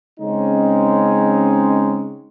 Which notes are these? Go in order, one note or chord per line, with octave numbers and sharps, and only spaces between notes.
C#3 G#3 C4 C#4 D#4